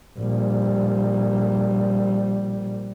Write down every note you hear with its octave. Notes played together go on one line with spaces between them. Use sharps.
A#1 G3